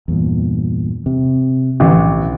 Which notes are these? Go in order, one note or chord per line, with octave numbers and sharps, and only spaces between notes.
E2 G2 A#2
C3
A1 B2 D3 F3
B1